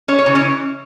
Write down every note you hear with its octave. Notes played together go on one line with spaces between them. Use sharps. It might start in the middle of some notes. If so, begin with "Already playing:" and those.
C#4 C#5
C#5
C#3 E3
C#4 C#5